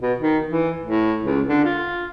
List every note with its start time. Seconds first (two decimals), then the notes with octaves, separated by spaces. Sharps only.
0.02 B2
0.20 D#3
0.50 E3
0.83 A2
1.23 C#2
1.48 D3
1.64 F4